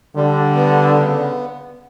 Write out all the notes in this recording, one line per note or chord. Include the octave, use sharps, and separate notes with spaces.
D3 G3
B3
C#3